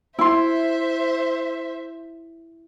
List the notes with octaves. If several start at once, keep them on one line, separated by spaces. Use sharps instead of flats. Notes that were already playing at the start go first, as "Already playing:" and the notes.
E4 C5 E5 C6